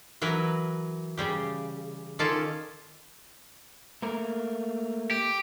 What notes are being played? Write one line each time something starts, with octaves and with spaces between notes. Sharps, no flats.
E3 F#3 A#4 B4
C#3 G3 G4
D#3 C#4 F4 A4 D5 A5
A3 A#3 A#4
G4